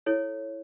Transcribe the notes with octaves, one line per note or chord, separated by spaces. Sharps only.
E4 A4 C#5